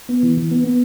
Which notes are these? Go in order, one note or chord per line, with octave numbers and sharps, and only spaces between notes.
B3
E3
E3
B3
B3